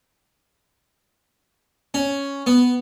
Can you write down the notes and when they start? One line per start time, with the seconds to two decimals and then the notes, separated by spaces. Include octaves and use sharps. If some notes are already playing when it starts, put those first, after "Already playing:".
1.94 C#4
2.47 B3